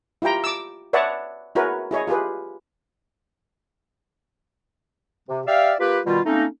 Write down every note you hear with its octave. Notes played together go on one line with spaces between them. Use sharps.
E4 F4 G4 G5 A#5
D6 E6
B4 C#5 D5 E5 F#5 A5
E4 F#4 G#4 A#4 B4 C#5
E4 G#4 C#5 D#5
F4 G4 G#4 B4
C3
G4 D5 E5 F5
A#3 F4 G4 B4
B2 D#3 G3 F4
A3 A#3 C4 C#4 D#4